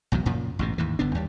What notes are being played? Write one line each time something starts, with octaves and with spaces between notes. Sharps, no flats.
B1 E2 A2 F#3
F#2 A#2 C#3 F3
A1 G#2 B2
D#2 G#2 E3
G1 D3 B3 D4
D#2 G3